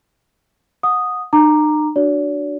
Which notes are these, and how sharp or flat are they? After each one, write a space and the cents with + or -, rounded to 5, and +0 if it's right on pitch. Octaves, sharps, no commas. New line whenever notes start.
F#5 -25 D#6 -5
D#4 -45 A#5 +0 D6 +15
D4 +10 F#4 +5 D5 -45